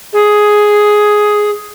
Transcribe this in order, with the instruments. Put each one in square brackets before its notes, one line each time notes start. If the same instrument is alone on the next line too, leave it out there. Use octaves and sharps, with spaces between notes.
[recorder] G#4